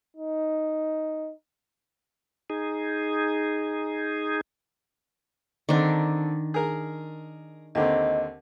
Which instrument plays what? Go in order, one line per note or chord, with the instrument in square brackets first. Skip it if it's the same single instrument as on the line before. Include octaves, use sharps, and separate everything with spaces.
[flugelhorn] D#4
[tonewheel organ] D#4 G#4
[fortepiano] D3 C4 D5 [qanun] D#3 D4
[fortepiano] G#4 A#4
[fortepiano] D#2 D3 C4 [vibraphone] D#5